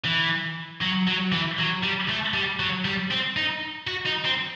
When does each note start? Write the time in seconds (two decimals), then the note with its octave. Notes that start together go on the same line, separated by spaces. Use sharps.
0.05 E3
0.82 F#3
1.08 F#3
1.32 E3
1.59 F#3
1.83 G3
2.09 A3
2.34 G3
2.60 F#3
2.85 G3
3.11 C4
3.37 D#4
3.87 F#4
4.06 D#4
4.25 C4